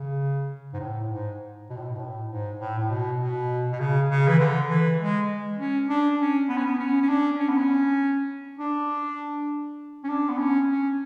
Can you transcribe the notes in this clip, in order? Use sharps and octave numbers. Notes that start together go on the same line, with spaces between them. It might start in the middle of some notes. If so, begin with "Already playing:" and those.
Already playing: C#3
G#2
A2
G#2
B2
A2
B2
G#2
A2
G#2
A2
A2
B2
B2
B2
C#3
C#3
E3
D3
E3
G#3
C#4
D4
C#4
B3
C#4
B3
C#4
C#4
D4
C#4
B3
C#4
D4
C#4
D4
B3
C#4
C#4